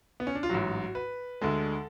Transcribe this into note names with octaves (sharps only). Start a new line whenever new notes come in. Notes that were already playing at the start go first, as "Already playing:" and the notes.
B3
C#4
D4
F4
A1 G#2 F#3 F#4
B4
D2 D3 G#3 A4